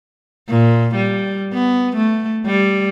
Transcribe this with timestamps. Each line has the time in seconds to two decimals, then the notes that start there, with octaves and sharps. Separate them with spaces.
0.49 A#2
0.95 G3
1.54 B3
1.96 A3
2.46 G3